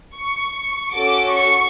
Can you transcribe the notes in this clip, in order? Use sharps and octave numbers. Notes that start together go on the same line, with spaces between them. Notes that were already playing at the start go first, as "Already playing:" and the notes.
C#6
C#4 F#4 A4 D6
C#6